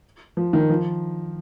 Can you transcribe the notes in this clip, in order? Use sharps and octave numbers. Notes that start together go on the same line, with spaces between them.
F3
D#3
F3